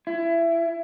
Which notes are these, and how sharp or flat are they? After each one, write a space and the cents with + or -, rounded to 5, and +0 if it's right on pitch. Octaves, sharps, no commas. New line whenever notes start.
E4 +20